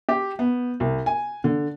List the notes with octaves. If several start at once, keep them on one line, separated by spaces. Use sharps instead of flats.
G4
B3
C2
G#5
D3